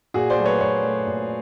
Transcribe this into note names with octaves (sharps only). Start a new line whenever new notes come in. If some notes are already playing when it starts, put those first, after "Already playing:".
A#2 F#4 G#4
C5 D5
F#3 A3
B4 C#5
A#2 B4 C#5
F#3 A3
A#2